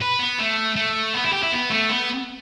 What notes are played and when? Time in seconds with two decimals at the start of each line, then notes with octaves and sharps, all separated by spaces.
0.02 B4
0.20 B3
0.39 A3
0.76 A3
1.14 B3
1.24 E4
1.32 G4
1.43 E4
1.52 B3
1.70 A3
1.89 B3